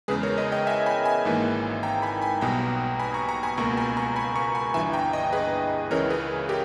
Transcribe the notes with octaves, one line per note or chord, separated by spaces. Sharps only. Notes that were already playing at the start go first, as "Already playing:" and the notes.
E2 C#3 G#3 G#4 B4
A#4 C#5
B4 D#5
D#5 G5
E5 G#5
G#5 B5
G#5 B5
G#1 G#2 E3 A#3
G5 A#5
G#5 B5
G#5 B5
B1 B2 G3 B3 G5 A#5
G#5 B5
A#5 C#6
A#5 C#6
G#5 B5
C#2 B2 A#3 A#5 C#6
G#5 B5
A#5 C#6
G#5 B5
A#5 C#6
G#5 B5
G1 G2 E3 E5 G#5
G5 A#5
D#5 G5
G#4 B4
C#2 C#3 E3 A#4 C#5
G#4 B4
G4 A#4